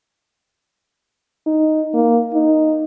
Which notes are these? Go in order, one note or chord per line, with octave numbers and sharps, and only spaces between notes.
D#4
A#3
D#4